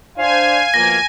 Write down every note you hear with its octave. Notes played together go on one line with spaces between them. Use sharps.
D4 C5 F5 G#5
B2 F3 A#3 A#6